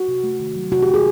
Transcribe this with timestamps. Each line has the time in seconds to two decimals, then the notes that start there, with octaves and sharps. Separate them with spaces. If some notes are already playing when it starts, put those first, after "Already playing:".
Already playing: F#4
0.08 C3
0.24 A3
0.39 D#3
0.56 F#3
0.72 C3 F#4
0.82 G4
0.88 C3
0.94 G#4